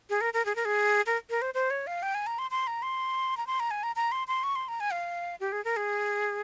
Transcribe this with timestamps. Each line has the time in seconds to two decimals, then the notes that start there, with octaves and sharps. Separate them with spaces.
0.10 G#4
0.21 A#4
0.34 A#4
0.45 G#4
0.56 A#4
0.65 G#4
1.06 A#4
1.30 A#4
1.42 C5
1.54 C5
1.70 C#5
1.87 F5
2.03 G5
2.15 G#5
2.27 A#5
2.39 C6
2.51 C6
2.67 A#5
2.82 C6
3.37 A#5
3.47 C6
3.60 A#5
3.71 G#5
3.83 A#5
3.96 A#5
4.12 C6
4.28 C6
4.43 C#6
4.56 C6
4.68 A#5
4.80 G#5
4.92 F5
5.40 G4
5.52 G#4
5.65 A#4
5.76 G#4